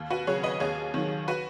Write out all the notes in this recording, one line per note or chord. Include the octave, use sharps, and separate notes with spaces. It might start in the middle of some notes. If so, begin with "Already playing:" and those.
Already playing: D#2
F#4 B4
C#3 F#3 G#4 C#5
B4 D#5
D#2 G#4 C#5
D#3 F#3
F#4 B4